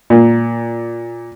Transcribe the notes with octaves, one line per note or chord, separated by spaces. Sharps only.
A#2